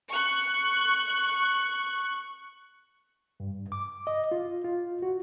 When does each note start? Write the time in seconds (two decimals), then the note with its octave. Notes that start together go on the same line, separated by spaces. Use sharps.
0.13 C#6 F#6
3.40 G2
3.72 D6
4.07 D#5
4.32 F4
4.64 F4
5.02 F#4